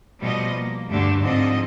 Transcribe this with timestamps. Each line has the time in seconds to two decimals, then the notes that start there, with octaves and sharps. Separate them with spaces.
0.20 B2 F3 G3 A3 D#5
0.53 A#3
0.89 D2 G2 D3 A3 D4 G4
1.21 G#2 D3 F3 C4 D#5